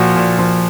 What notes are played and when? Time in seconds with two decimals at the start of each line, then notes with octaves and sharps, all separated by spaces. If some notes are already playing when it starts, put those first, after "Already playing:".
Already playing: A#2 F3 F#4
0.16 A#2
0.39 F3